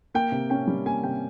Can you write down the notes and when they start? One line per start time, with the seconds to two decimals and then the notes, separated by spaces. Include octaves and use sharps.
0.14 A#3 G5
0.32 C3
0.50 C#4 G5
0.67 G3
0.86 A#3 G#5
1.03 C3 G5